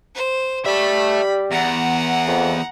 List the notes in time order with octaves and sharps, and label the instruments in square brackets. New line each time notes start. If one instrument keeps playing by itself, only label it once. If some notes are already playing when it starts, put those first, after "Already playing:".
[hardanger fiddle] C5
[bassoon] G3 [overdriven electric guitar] E5 A5 [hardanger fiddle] B5
[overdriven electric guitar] E2 [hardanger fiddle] F#5 A#5
[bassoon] F2